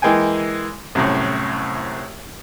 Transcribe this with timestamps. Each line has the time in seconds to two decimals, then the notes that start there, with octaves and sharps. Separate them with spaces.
0.02 E3 G#3 A#3 G5 G#5
0.95 C2 F#2 A2